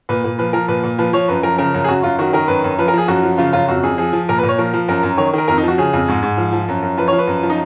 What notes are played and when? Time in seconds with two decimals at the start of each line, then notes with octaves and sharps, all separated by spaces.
0.09 A#2 B4
0.24 A#2
0.38 F3 B4
0.53 F3 A#4
0.68 A#2 B4
0.84 A#2
0.98 F3 B4
1.13 F3 C#5
1.28 F#2 B4
1.43 F3 A#4
1.58 C#3 A#4
1.74 F#2
1.84 G#4
1.88 F#2 F#4
2.03 F#2 F4
2.19 D#3 F#4
2.33 D#3 A#4
2.48 F#2 B4
2.64 F#2
2.78 F3 B4
2.88 A#4
2.93 F3 G#4
3.08 F#2 F#4
3.23 F3
3.38 C#3 F4
3.53 F#2 F4
3.68 F2 F#4
3.83 F2 G#4
3.98 F3 G#4
4.13 F3
4.29 A#2 A#4
4.38 B4
4.43 A#2
4.49 C#5
4.58 F3 A#4
4.74 F3
4.88 F#2 A#4
5.03 F#2
5.18 D#3 C#5
5.34 D#3 A#4
5.48 F2 A#4
5.58 D#4
5.63 F3 F#4
5.78 C#3 G#4
5.93 F2
6.08 G#2
6.22 G#2
6.37 F3
6.53 F3
6.68 F#2
6.82 F#2
6.97 F3 B4
7.08 C#5
7.12 F3
7.18 B4
7.27 F#2
7.43 F3
7.50 D#4